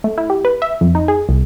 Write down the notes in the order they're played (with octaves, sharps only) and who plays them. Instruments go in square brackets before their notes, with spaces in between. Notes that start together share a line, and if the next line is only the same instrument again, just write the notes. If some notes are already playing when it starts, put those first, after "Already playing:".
[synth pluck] A3
E4
G4
B4
E5
F2
D#4
G#4
C2